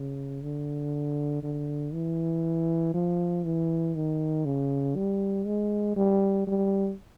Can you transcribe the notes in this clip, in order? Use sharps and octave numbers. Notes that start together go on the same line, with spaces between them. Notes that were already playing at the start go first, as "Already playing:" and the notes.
Already playing: C#3
D3
D3
E3
F3
E3
D#3
C#3
G3
G#3
G3
G3